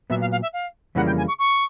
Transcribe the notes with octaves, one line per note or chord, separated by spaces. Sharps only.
A#2 F#3 B3 E5
F5
F5
E5
F5
F2 C#3 E3 G3 A#3 F#5
G5
G#5
C#6
C#6